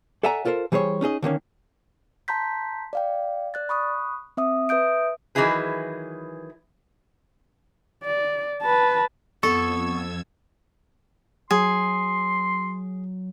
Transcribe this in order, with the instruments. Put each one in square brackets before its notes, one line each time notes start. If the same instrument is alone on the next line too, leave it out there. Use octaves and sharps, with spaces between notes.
[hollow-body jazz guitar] A4 D5 E5 F#5 G#5 A#5
F4 A4 A#4 C5
E3 G3 G#4 C5 C#5
C#4 D#4 G#4 D#5
D3 D#3 A#3 C#4
[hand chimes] A5 A#5 C6 G6 B6
D5 F5 G5
D5 F#6 A6
B5 C#6 D#6 F#6
C4 E5 D#6
B4 E5 D#6 G6 D7
[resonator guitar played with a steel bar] D#3 E3 F#3 E4 G#4 B4
[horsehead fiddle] D5
B4 A5
[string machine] F2 E6 G#6 [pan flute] B3 [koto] A4 [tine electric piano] C#6
[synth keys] F#3 [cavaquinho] G#4 [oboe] C6